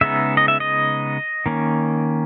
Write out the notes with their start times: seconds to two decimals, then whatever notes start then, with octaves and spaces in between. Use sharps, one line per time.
0.01 C#3 G#3 B3 D#4 E5
0.37 D#5
0.48 E5
0.60 D#5
1.46 D#3 A#3 C#4